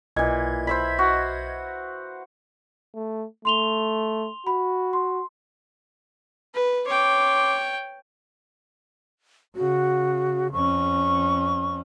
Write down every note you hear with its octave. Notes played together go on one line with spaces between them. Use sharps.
B1 A#2 E3 D#5 G#6
C5 E5 B5
F#4
A3
A3 C6 F7 G7
F#4 B5
C6
B4
C#4 C#5 G5 C6 D6
C#3 F#4
F2 C#4 C#6